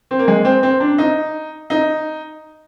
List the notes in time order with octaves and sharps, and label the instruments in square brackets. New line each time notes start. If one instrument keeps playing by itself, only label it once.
[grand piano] C4
A#3
G#3
C4
C4
D4
D#4
D#4